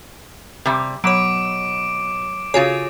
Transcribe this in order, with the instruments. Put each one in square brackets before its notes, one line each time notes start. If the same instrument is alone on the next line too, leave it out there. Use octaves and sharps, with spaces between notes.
[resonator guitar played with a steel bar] C3 G3
[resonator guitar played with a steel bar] B2 [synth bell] F#3 C#5 [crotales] D6 D7
[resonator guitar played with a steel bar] C#3 G#4 [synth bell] F4 F#4 C#5